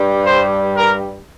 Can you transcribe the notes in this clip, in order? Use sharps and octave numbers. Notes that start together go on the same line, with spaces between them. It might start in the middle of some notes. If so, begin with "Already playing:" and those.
Already playing: G2 G3
C5
A#4